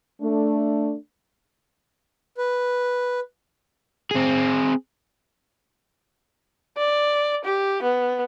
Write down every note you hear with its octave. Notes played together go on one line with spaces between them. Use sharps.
A3 D4
B4
C4 G#4
D5
G4
B3